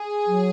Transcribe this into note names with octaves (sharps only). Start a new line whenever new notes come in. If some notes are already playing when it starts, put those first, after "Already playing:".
Already playing: G#4
F#3